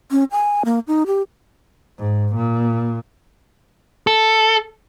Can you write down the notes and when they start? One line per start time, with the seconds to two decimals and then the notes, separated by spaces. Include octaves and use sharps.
0.11 C#4
0.31 G#5
0.65 A#3
0.88 D#4
1.07 G4
1.99 G#2
2.35 A#2
4.07 A4